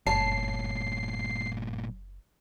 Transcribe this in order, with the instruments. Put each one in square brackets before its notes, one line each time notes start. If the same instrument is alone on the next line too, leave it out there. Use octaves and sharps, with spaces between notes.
[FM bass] F#1 [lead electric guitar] G2 A#2 [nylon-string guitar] C#5 A5 [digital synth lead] C7